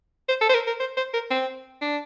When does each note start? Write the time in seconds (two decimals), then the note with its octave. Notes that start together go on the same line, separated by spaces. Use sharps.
0.28 C5
0.41 A4
0.49 C5
0.54 A#4
0.67 A#4
0.80 C5
0.97 C5
1.13 A#4
1.31 C4
1.82 D4